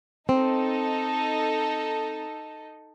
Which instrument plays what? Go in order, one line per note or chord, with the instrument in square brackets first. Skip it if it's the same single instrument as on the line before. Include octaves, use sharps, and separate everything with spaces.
[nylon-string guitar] C4 [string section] D#4 A4